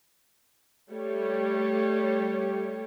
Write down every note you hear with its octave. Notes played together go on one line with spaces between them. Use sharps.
G3 A3 G4 C#5